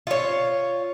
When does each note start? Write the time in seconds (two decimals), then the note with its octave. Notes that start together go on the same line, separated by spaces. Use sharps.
0.07 F4 C#5